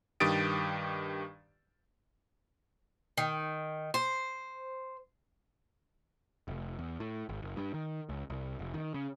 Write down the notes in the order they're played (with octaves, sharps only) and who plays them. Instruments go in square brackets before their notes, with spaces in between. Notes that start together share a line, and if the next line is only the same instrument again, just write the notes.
[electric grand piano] G2 D#3 G4 D#6 A6 D7
[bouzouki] D#3
C5
[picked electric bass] F1
E2
A2
G#1
F#1
G2
D#3
C#2
C2
F1
D#3
C#3